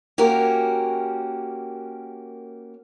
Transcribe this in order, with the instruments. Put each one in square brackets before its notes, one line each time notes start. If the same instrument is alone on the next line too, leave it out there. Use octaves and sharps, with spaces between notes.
[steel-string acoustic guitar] A#3 C#4 F#4 G4 A#4